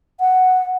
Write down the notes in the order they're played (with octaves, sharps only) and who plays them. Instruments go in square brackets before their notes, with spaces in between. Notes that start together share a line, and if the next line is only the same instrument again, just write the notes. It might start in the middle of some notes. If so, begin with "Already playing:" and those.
[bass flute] F#5